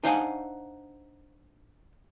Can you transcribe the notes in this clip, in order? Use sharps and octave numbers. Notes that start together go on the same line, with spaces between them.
D4 D#4 C5 F5 F#5 G#5